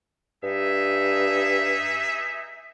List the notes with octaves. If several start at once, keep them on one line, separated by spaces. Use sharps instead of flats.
G2 D#4 G#4 E5